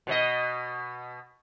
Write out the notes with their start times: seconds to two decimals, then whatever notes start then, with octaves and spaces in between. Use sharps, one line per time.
0.07 B2 C#5 D#5